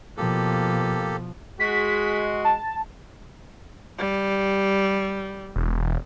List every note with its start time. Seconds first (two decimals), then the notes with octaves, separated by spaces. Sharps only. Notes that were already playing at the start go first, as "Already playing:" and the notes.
0.17 B2 F3 A#3 G4 A4
1.60 G#3 F#4 B6
2.44 A5
3.98 G3
5.56 E1